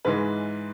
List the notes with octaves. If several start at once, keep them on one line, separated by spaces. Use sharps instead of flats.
G#2 E3 G#3 B4